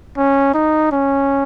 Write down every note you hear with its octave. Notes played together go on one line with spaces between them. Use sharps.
C#4
D#4
C#4